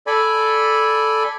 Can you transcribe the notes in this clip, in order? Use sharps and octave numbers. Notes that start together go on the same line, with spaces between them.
A4 D5 G#5 B5